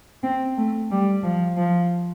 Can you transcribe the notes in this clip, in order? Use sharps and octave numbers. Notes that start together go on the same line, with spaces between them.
C4
A3
G3
F3
F3